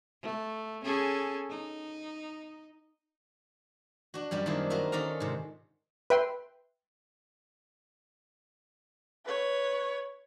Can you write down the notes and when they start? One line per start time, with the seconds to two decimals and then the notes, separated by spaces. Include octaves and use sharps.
0.22 A3
0.84 C#4 G#4 A4
1.49 D#4
4.14 D4 F#4
4.31 F#2 G3 D4 F4
4.46 D#3 A#3 C4 D4 E4
4.70 F4 F#4 A#4 E5
4.92 D#3 C#4 A4 D5 F5 A#5
5.20 G#2 C3
6.10 B4 E5 G5 C6
9.26 B4 C#5